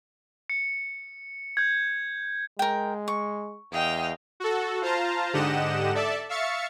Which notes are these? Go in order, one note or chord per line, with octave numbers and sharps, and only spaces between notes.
C#7
G6 G#6
G#3 A#4 G5
C#6
E2 D#5 F5 G5
F#4 A4
F4 C5 F5 A5 A#5
G#2 D3 G4 D#5 F#5 E7
A4 D5 E5 A5
E5 F5 C#6 A6 C#7